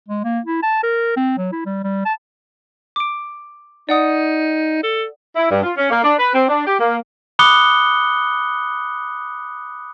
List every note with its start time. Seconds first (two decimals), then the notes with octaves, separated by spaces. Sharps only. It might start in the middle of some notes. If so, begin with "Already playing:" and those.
0.08 G#3
0.24 A#3
0.45 E4
0.62 A5
0.83 A#4
1.16 C4
1.38 F#3
1.52 E4
1.66 G3
1.84 G3
2.05 A5
2.96 D6 D7
3.89 D#4 D5 F#5 D#6
4.83 A4
5.36 E4
5.51 G2
5.63 F4
5.77 C#4
5.90 A#3
6.04 D4
6.19 B4
6.34 C4
6.49 D4
6.67 G4
6.80 A#3
7.39 B5 D6 D#6 F#6 C#7 G7